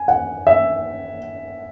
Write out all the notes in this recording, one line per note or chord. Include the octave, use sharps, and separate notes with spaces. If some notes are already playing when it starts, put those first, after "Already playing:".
Already playing: G#5
F#5
E5